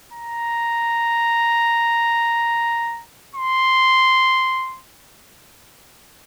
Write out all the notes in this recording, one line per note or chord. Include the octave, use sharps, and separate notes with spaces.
A#5
C6